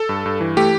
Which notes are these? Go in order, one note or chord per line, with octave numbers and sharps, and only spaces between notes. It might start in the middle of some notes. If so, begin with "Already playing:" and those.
Already playing: A4
G2
G2
E3
A3 G4